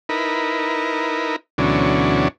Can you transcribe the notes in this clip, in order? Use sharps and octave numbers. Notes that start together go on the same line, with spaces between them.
D#4 E4 A#4 B4
D2 B2 E3 F#3 C#4 D4